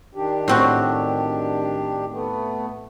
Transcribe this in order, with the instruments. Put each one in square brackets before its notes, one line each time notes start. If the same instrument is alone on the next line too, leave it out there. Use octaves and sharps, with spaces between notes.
[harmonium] D#3 D4 G4
[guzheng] A2 C4 F#4
[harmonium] A3 B3